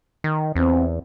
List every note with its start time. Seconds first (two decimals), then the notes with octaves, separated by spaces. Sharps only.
0.24 D#3
0.56 E2 C4